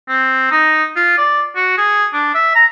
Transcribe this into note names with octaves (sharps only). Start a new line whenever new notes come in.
C4
D#4
F4
D5
F#4
G#4
D4
E5
A#5